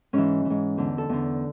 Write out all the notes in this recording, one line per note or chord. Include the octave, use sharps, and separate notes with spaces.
G#2 E3 C#4
E3
G#2
E2 D3
A4
E2 D3